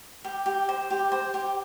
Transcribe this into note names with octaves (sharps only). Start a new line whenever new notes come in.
G4
G4
C5
G4
C5
G4